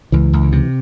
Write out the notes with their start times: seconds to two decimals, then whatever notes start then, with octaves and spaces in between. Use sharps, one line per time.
0.12 C#2 E3
0.33 C#2
0.52 C3